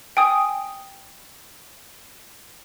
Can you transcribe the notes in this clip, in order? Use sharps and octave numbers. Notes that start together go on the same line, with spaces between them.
G5 G#5 D#6